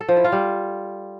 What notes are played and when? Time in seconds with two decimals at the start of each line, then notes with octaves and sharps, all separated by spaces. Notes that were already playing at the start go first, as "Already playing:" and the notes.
0.01 A4
0.09 F3
0.16 E4
0.24 F4
0.32 G3